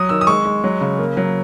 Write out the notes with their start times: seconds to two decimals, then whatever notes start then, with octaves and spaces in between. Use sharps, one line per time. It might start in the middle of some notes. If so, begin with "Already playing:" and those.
Already playing: F#3 D#6
0.09 D#3 E6
0.21 D#6
0.27 G#3 C#6
0.45 G#3
0.64 F#3
0.81 C#3
0.98 A#3
1.17 F#3